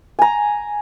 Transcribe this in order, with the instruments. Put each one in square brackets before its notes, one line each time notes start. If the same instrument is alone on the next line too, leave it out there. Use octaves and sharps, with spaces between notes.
[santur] G#5 A#5